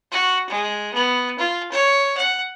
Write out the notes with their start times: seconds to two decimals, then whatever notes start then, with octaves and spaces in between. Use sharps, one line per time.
0.12 F#4
0.50 G#3
0.94 B3
1.39 F4
1.72 C#5
2.17 F#5